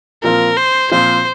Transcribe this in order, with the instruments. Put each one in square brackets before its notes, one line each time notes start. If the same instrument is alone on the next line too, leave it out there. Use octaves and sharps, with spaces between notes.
[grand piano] A#2 F3 C4 F4 [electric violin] A#4
[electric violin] C5
[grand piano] A#2 F3 C4 F4 [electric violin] C5